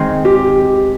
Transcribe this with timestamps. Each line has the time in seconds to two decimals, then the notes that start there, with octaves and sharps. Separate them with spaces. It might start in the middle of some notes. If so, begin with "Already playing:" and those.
Already playing: D#3 G#3 C4
0.25 G4